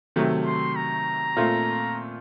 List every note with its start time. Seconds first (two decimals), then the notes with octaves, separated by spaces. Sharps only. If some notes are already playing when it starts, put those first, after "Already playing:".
0.16 C3 D#3 F#3 A3
0.46 C6
0.76 A#5
1.36 A#2 A3 C4 F4